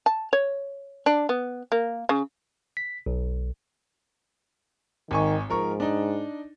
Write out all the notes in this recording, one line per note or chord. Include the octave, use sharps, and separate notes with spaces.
A5
C#5
D4
B3
A#3
C#3
B6
B1
G#1 D#3 G#5 C#6
G#2 F3 A#4 C#6
D4 D#4